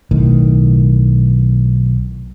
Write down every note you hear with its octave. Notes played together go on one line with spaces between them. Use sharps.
B1 A2 D#3